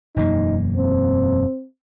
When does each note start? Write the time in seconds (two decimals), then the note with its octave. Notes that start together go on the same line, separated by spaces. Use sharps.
0.16 E1 F#2 A#3 D#4
0.76 C4